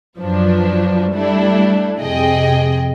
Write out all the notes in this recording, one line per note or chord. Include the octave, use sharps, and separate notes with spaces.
F#2 F3 F#3 D4 B4
G3 A3 D4 E4
F2 C3 G#4 D#5 G5